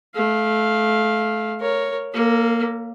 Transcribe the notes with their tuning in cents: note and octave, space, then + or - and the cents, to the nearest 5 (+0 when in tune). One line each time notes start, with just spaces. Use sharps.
A3 -25 F5 +0
A#4 +0 C#5 +0
A#3 +0 A4 +40